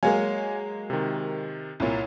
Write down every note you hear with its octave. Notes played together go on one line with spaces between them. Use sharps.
F#3 G#3 A#3 C#5 F5 G#5
C3 D#3
C2 A#2 E4 C#5